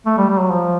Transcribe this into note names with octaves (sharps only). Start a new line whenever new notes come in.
A3
G3
G3
F#3
F3